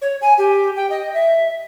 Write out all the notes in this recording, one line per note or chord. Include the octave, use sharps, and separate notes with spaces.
C#5
G#5
G4
G5
D#5
E5